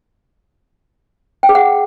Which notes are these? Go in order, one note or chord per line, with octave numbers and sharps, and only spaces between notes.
G5
G#4
F#5